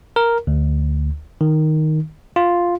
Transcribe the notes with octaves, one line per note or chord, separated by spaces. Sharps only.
A#4
D2
D#3
F4